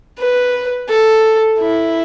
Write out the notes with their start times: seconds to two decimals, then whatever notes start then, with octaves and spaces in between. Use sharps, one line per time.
0.19 B4
0.89 A4
1.59 E4